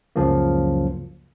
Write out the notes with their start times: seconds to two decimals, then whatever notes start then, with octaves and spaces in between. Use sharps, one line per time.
0.16 C#2 F#2 C#3 F3 F#3 A#3